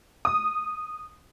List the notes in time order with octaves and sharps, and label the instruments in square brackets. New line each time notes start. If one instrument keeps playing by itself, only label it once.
[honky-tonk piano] D#6